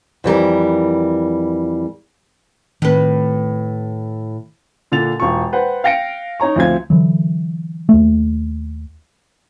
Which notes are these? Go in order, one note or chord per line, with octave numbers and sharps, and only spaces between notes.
F2 E3 G3 A#4
A2 D#3 C4 B4
A#2 D3 A6 F7
E1 F4 C#6
B4 C5 F#5 G5
F5 G5 A#6 C#7 D7
D#4 C#5 A#5 C#6
D2 F3 C4 F4 G#6
D3 E3 F#3
D#2 A3